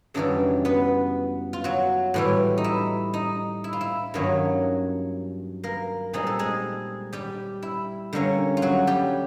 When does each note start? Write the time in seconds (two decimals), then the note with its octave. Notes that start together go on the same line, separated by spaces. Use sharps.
0.14 F#2 C#3 E3 G3 D4 D5
0.65 B3 B4
1.53 F4
1.64 F#3 F#4
2.14 A2 E3 G3
2.58 D#4
2.64 E4
3.14 D#4
3.64 E4
3.73 F4
3.81 E4
4.14 G2 D#3 F#3 A#3 C#4
5.63 A#3 A#4
6.13 A#2 G3 C4 D#4 G#4
6.27 A4
6.39 G#3 G#4
7.13 G3 G4
7.62 E4
8.13 D3 G3 A#3 C#4
8.57 F4
8.62 F#3 F#4
8.87 G3 G4